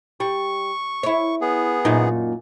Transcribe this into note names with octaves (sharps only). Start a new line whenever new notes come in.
G3 C#6
E4 C#5
B3 G#4
F#2 A#2 D#4